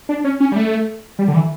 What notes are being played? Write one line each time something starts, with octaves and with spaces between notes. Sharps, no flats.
D4
C#4
C#4
G3
A3
G3
D3
E3